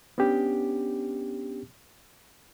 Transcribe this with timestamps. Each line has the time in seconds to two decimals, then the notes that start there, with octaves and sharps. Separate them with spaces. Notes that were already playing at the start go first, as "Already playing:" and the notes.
0.18 B3 C#4 D4 G4